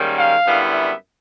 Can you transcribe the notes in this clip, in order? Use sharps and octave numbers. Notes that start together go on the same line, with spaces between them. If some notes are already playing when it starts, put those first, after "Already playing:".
Already playing: G#2 D#3 G3 A#3 C#4
F5
F#2 D3 G3 B3 E4
E5